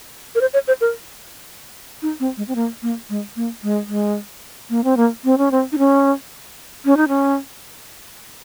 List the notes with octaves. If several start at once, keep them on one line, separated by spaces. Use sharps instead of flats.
A#4
C5
C#5
C5
A#4
D#4
C4
G#3
C4
A#3
A#3
G#3
A#3
G#3
G#3
A#3
C4
A#3
C4
C#4
C4
D#4
C#4
C#4
D#4
C#4